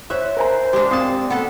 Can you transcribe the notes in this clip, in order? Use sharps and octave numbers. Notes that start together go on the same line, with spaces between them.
C5 C#5 E5 F#6
A#4 C5 G#5 A#5
G#3 D4 G4
A#2 C4 A5 D#6 C7
B3 A4 F#5